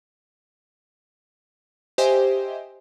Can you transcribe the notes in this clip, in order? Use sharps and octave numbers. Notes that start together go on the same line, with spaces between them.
G4 C5 D#5 E5 G5 G#5